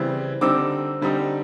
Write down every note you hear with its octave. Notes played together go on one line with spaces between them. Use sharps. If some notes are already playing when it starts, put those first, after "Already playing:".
Already playing: C#3 E3 G3 C4
D3 G3 C4 D#4 D6 E6
D3 G3 C4 D#4